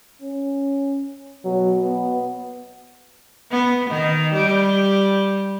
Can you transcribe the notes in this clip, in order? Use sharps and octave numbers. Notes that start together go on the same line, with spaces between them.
C#4
B2 F#3
B3
B3
D#3
G3